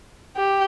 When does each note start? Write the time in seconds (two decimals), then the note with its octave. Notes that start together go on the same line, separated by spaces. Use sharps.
0.36 G4